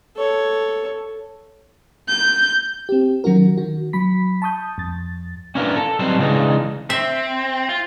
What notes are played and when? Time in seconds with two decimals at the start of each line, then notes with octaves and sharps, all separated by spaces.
0.16 A4 C#5
2.09 G6
2.89 C4 G4
3.24 D#3 F#3 C#4 F#4 A#4
3.57 D#3 F#4
3.93 F#3 B5 B6
4.42 A5 C#6 D#6 G6
4.78 F2 A6
5.55 C#4 D4 E4 F4 A#4 B4
5.76 A4
5.99 F#3 G3 C4 D#4 B4 C5
6.19 C#3 E3 G#3 D4 D#4
6.90 C4 E5
7.69 F4